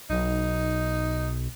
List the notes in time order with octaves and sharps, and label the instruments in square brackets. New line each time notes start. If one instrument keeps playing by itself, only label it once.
[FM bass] B1 [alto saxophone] D#4